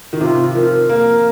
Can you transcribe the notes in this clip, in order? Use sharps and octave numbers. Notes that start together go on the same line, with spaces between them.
D#3
C3 F4
F3 A#4
A#3